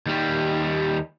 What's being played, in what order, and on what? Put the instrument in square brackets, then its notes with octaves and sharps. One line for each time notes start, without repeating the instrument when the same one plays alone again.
[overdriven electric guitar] D#2 G3